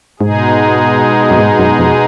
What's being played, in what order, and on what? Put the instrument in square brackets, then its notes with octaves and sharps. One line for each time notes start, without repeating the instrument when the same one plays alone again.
[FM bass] G#2 [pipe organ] B2 G#3 D#4 G#4
[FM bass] F#2
G#2
F#2
F2